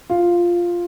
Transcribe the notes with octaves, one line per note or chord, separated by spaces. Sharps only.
F4